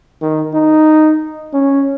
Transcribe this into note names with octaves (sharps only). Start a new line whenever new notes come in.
D#3
D#4
C#4